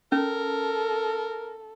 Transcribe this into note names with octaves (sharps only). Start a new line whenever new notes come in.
C#4 A4 A#4